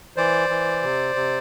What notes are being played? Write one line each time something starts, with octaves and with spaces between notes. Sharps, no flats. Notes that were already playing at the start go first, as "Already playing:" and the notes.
E3 C5 D5
E3
C3
C3